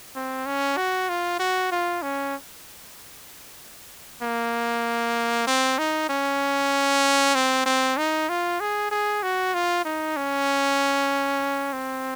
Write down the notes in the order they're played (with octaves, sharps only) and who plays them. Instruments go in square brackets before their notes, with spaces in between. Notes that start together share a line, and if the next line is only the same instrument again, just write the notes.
[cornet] C4
C#4
F#4
F4
F#4
F4
C#4
A#3
C4
D#4
C#4
C4
C4
D#4
F4
G#4
G#4
F#4
F4
D#4
C#4
C4